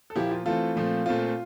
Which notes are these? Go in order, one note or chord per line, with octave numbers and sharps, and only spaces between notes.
A4
A#2 F3 A#3 E4 G4
F4
E3 A3 C4 F4 A4
A#2 F3 A3 C4
A#2 A3 C4 F4